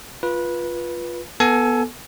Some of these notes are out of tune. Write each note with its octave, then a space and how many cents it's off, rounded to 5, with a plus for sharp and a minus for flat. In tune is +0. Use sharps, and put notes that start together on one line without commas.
F4 +0 B4 -20
B3 -10 A4 +0 G#5 +20